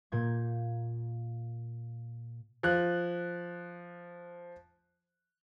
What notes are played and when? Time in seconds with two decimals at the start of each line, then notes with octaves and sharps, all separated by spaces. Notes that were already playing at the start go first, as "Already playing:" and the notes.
0.12 A#2 A#3 G6 G#6
2.63 F3 F#6